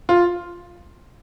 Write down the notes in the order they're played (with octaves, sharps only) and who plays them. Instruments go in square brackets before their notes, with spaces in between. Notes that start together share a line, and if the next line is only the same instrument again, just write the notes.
[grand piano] F4